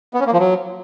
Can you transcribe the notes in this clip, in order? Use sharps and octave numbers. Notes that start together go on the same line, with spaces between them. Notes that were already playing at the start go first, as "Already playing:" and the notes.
B3
C#4
A#3
F3
F#3